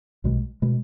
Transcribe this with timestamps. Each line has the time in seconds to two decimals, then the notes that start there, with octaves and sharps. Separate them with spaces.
0.24 B1 B2 G#3
0.62 B2 G#3